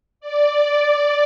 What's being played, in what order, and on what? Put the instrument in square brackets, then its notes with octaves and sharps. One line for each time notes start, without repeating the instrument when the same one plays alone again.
[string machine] D5